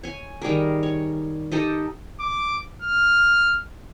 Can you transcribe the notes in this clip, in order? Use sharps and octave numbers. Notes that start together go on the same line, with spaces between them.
C#5 G#5
D#3 G3 G#4 A#4
C#5
D#4 G4 A4 D#5
D6
F6